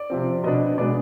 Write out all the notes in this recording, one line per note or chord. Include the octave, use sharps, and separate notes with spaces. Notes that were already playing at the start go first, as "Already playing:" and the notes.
Already playing: D5
C3 F3 C4
B2 B3 D4 D#5
B2 G#3 B3 D4 D5